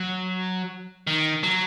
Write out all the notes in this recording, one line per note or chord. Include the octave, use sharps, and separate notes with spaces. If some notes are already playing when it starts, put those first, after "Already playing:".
Already playing: F#3
D#3
F#3